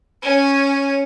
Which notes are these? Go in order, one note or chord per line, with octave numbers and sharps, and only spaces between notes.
C#4 C#5